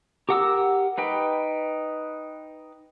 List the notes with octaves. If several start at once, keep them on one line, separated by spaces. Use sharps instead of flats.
G4 A#4 F#5 D6 E6
D#4 B4 G5